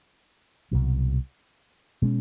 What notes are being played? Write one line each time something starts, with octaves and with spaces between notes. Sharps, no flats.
C2 B2 F#3
B2 G#3 C#4